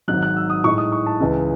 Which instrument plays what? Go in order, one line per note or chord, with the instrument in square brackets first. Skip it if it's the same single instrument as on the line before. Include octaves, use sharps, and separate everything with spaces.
[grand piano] G#1 G#2 F#3 F#6
F#6
E6
D#6
A2 G#3 D#4 C#6
D#6
C#6
A5
C#2 C#3 E3 G#3